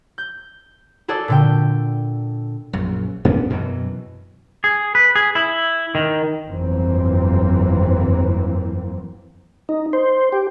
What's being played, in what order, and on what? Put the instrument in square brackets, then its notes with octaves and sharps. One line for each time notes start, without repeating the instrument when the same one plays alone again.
[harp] G6
F#4 G#4 A4 D5 E6
A#2 D3 G5
[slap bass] A#1 F#2
F#2 B3 C#4 D4
F#2 B2 E3 F#3
[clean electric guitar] G#4
B4
G#4
E4
D#3
[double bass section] G1 F2 E3 F#3 A#3 C4
[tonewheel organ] D#4
C5
G4